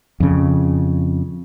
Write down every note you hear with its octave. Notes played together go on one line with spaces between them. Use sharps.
F2 C#3